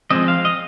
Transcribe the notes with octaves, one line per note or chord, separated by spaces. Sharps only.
F3 G#3 C4 D#5
F5
D#5